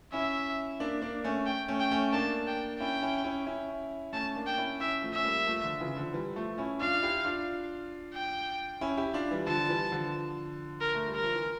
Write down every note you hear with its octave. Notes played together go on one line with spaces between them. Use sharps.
C#4 E4 E5
A#3 D4
A#3 D4
A3 C#4
G5
A3 C#4
G5
A3 C#4
A#3 D4 A5
G5
C#4 E4 G5
C#4 E4
C#4 E4
C#4 E4
A3 C#4 A5
A#3 D4
G5
C#4 E4
C#4 E4 E5
F3 A3
C#4 E5
G3 A#3
F3 A3
D3 F3
C#3 E3
D3 F3
E3 G3
F3 A3
C#4 E4
D4 F4 F5
E4 G4
D4 F4
G5
C#4 E4
E4 G4
D4 F4
E3 G3
D3 F3 A5
E3 G3
D3 F3
A#4
A3
G3
A#4
F3
E3